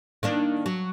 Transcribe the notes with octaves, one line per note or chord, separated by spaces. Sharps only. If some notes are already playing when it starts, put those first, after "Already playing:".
D#3 A#3 D4
F#3